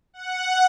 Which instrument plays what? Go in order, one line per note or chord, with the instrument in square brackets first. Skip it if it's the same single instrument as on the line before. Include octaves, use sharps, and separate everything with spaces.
[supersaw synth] F#5